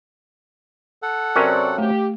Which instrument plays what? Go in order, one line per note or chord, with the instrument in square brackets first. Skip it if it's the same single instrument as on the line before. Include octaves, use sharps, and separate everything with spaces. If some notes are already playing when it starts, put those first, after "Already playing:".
[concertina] A4 F#5
[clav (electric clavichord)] C3 F#3 C#4 [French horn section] C4 D5 [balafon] A#4
[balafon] A3 [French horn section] G4